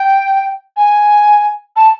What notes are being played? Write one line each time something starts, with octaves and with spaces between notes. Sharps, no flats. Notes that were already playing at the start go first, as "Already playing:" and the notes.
Already playing: G5
G#5
A5